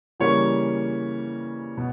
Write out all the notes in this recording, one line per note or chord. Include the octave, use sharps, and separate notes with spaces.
C#3 E3 G3 A#3 C#5
B2